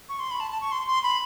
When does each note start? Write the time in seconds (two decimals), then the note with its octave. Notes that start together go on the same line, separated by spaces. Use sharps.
0.09 C#6
0.19 C6
0.31 B5
0.40 A5
0.51 A5
0.61 C#6
0.72 C6
0.88 C6
1.03 B5